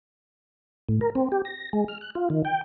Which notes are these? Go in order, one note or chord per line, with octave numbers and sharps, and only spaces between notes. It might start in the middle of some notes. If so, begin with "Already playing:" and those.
A2
A#4
C4
G4
A#6
G#3
F6
F#6
F4
D#3
G5